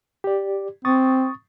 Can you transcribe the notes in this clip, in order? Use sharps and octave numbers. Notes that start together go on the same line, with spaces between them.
G4 D5
C4 C#6 D#6 A6